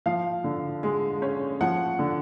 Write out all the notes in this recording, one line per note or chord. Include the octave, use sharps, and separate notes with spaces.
F3 F5
D3
G#3
C#4
F3 F#5
D3